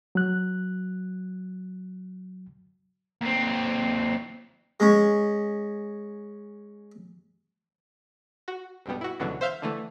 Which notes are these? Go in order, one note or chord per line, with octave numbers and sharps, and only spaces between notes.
F#3 F#6
D#2 C4
G#3 C#4
F#4
B1 G2 B2 G3 B3
E4 F#4
C#2 B2 D3 E3 F#3
C5 E5 F5 F6 G6
D3 E3 A3